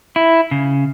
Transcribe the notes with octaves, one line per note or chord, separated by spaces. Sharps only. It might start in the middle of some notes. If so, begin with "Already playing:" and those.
E4
C#3